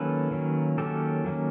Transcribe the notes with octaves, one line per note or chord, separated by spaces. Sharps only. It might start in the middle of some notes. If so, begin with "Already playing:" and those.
Already playing: D#3 F#3 A#3 C#4 A4 B4
D#3 F#3 A#3 C#4
D#3 F#3 A#3 C#4 G4 A4
D#3 F#3 A#3 C#4